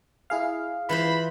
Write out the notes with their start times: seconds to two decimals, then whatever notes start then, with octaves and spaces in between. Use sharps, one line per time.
0.30 E4 G#4 F5
0.89 E3 F4 C5 B5